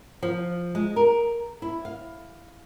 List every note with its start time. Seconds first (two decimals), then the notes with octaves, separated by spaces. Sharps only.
0.22 F3
0.75 G#3
0.96 A#4
1.62 E4
1.85 F5